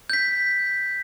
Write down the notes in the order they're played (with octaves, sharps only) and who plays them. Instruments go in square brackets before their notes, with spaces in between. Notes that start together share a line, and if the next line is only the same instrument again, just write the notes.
[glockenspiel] G6 B6